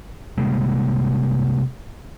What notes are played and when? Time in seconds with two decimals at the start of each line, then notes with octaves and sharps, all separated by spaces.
0.38 C3 G3 G#3 A#3